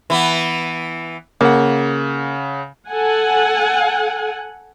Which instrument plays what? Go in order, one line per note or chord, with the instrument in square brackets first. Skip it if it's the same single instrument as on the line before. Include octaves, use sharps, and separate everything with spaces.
[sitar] E3 B3
[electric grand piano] C#3 F#5 [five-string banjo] A#3
[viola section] A4 F#5 G#5